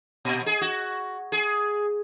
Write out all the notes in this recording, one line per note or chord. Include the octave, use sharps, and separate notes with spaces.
A#2
G#4
F#4
G#4